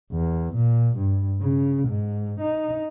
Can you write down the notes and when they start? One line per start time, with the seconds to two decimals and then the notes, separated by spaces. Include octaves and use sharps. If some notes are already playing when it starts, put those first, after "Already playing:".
0.12 E2
0.55 A#2
0.97 G2
1.41 C#3
1.89 G#2
2.40 D#4